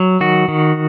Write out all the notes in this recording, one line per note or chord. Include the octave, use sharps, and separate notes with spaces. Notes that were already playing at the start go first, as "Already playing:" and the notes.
Already playing: F#3
D#3 F#4
D#3